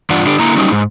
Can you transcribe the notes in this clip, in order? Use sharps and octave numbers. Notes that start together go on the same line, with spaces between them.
G2 E3 D4 F4 D5 F#5
D3 D4 G4
D3 A#3 E4 A#5
F#3 G3 C#4 D#4
G#2